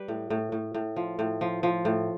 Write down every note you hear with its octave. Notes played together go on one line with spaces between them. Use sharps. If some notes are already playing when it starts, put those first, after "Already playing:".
Already playing: G3 B4
A2
A2
A2
A2
F3
A2
F3
F3
A2